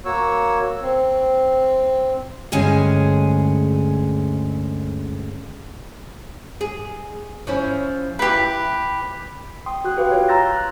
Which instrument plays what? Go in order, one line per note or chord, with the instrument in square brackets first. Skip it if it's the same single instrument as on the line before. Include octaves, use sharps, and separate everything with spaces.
[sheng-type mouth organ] A#3 F#4 C#5 E6
C4
[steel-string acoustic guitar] D2 G2 G#3 C#4 G#4 G#5
[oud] G#4
F3 C#4 E4
[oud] E4 [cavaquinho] G4 B4
[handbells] G5 C6 D#6
F#4 F#6
G4 B4 F5 G5
F4 C#5
A#5 C6 E6 G6 A6 A#6
F#6